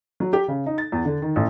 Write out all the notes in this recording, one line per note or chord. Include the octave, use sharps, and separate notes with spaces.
F#3
G4
C#3
D#4
A6
E2
D3
D#3
A1